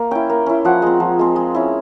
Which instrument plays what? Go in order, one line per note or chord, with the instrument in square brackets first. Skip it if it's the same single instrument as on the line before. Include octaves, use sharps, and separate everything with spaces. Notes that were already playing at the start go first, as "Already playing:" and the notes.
Already playing: [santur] A#3
C#4 E4 G5
A#3
C#4 E4
F3 F#5
G#3 C4
F3
G#3 C4
G#3
C#4 E4